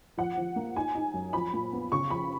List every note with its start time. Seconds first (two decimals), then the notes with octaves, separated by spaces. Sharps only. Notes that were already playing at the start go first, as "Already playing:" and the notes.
0.18 F3 F#5
0.37 F3
0.56 A#3
0.76 D#4 G#5
0.95 D#4
1.14 F#2
1.33 F3 B5
1.53 A#2
1.73 B3
1.92 C#3 C#6
2.10 F3 B5